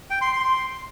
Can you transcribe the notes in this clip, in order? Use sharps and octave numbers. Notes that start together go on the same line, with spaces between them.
G5
C6
C6
C6